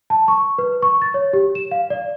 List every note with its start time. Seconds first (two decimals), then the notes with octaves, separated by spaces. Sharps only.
0.10 A5
0.28 C#6
0.58 B4
0.82 C#6
1.02 A6
1.14 C#5
1.33 G4
1.55 E7
1.71 F5
1.90 D5